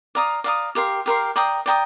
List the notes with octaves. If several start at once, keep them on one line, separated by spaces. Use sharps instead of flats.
D5 F5 A#5 D#6
D5 F5 A#5 D#6
G4 A#4 F5 C6
G4 A#4 F5 C6
D5 G5 A#5 D#6
D5 G5 A#5 D#6